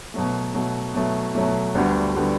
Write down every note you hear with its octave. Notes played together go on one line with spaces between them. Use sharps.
B2 F#3 A3
B2 F#3 A3
B2 F#3 A3
B2 F#3 A3
D2 D3 G3 B3 F#4
D3 G3 B3 F#4